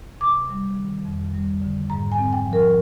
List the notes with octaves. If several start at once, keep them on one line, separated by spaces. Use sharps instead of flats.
C3 D6
G3
D#3
F2
G3
D3
G#2 A#5
G#5
C4
G5
F3
A#4